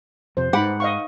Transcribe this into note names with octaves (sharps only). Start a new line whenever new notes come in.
F2 C3 C5
G#2 D#4 F#5 B5 D6
D#5 F5 C#6